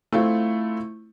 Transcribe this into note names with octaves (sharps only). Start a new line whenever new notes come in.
A3 C4 E4 F4